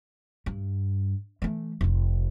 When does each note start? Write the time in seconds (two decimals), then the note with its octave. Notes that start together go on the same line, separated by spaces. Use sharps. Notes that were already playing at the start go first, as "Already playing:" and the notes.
0.46 G2
1.42 E3 A3
1.81 F1 F4